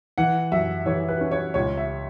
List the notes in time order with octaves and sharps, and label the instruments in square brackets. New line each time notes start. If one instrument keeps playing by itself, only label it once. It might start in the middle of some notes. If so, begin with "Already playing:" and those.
[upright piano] E3 F#5
F#2 E5
E3 C#5
B4
C#4
C#5
C#2 C#5
E5